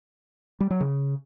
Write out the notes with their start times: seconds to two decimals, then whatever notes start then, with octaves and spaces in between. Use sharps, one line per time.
0.60 G3
0.71 F#3
0.81 C#3